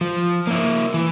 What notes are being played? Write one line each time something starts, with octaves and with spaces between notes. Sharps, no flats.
F3
A#3 E4
E3